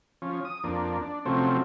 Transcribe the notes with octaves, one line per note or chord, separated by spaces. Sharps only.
F3 C#4
D#6
F2 A#3 D4
D4
C3 F3 F#3 A3 C4 C#4